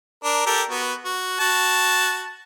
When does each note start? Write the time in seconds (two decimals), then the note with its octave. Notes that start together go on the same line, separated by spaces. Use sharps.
0.24 D4 A#4
0.46 G4 A4 A#4
0.70 B3 F#4
1.05 F#4
1.40 F#4 A5